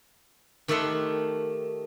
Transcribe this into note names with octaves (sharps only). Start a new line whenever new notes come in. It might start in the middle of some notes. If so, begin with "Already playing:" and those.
D#3 A3 G4 A4 F#5 C6